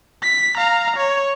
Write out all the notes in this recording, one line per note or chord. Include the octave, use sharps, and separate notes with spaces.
B6
F5 A#5
C#5